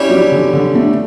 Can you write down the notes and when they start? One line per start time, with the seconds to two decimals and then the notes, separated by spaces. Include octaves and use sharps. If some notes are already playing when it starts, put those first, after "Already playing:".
Already playing: G3 C#4 E4 G4
0.10 F#3
0.32 D3
0.53 D3
0.75 A3